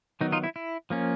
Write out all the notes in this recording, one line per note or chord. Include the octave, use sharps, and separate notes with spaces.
D#3 F#3 B3 D#4
D#4 F4
E4
E4
F3 A#3 C#4